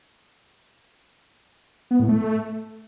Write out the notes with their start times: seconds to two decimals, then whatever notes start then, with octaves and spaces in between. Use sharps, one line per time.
1.91 B3
2.00 A2
2.09 A3